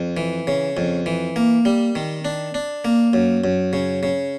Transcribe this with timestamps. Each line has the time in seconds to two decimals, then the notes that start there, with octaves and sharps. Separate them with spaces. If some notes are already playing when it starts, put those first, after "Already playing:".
Already playing: F2
0.17 E3
0.47 C#3
0.77 F2
1.06 E3
1.36 A#3
1.65 G3
1.95 D#3
2.25 D4
2.54 D4
2.85 A#3
3.13 F#2
3.44 F#2
3.73 C#3
4.03 C#3